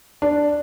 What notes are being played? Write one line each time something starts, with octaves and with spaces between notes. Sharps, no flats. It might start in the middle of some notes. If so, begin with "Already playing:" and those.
D4